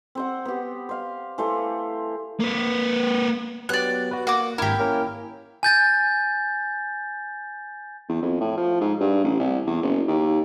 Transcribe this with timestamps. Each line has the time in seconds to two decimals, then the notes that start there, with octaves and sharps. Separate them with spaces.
0.15 C4 C5 F#5
0.45 B3 G4
0.89 C5 F5
1.38 E3 A3 C5 F5
2.40 A#3 B4
3.69 F#3 B3 G4 D5 F#6
4.11 F#4 B4
4.27 A#3 F#4 D6
4.58 G#1 E4 G4 A#4
4.79 A#3 C#4 A#4
5.63 G#5 G6 A6
8.09 E2
8.22 F2
8.40 A2
8.57 F3
8.80 G#2
9.00 G2
9.24 A1
9.39 C2
9.67 E2
9.82 F#1
10.08 D#2